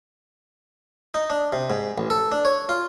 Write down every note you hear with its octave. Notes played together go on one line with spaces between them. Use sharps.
D#4
D4
C3
G#2
A1
A4
D4
C#5
F4